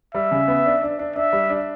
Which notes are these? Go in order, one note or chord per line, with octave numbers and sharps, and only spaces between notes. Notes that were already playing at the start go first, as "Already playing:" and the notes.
G3 E5
C#3
B3
D4
D4
D4
D4 E5
G3
D4